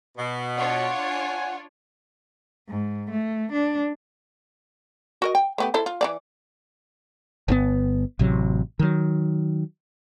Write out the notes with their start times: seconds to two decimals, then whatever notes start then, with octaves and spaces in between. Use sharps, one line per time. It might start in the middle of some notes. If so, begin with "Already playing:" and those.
0.17 B2
0.57 D4 F4 C#5 F#5
1.11 G#5
2.68 G#2
3.10 A3
3.52 D4
5.22 F#4 A#4 D#5
5.35 G5
5.58 A3 B3 G4
5.74 E4 A4 C5
5.86 F4
6.01 E3 C4 D5
7.48 G1 C#3 B3
8.19 A1 C3 F#3
8.79 D#3 F#3